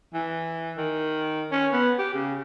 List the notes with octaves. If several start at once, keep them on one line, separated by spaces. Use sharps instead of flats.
E3
D#3
C#4
B3
G4
C#3